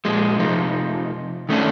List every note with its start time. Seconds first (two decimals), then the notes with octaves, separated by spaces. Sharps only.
0.05 A#2 F3 G#3
0.39 C3 F3 D#4
1.49 D#3 A3 C#4 D4